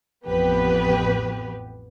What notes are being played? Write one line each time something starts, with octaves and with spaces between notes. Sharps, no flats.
A1 F2 B3 G4 B4